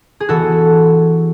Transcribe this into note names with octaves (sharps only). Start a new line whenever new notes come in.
G#4
E3 B3 F#4 A4